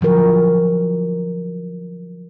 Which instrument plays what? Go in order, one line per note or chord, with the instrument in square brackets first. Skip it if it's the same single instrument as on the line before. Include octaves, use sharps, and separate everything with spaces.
[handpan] D3 F3 F#3 A#4